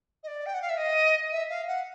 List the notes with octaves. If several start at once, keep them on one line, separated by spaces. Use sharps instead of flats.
D#5
D5
G5
F#5
F5
E5
D#5
E5
F5
F#5